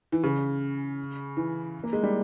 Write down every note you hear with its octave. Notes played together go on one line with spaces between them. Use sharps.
E3
C#3
E3
A#3
G#3
G3